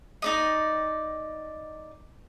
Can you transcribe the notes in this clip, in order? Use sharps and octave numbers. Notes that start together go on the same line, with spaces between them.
D#4 D5 D#5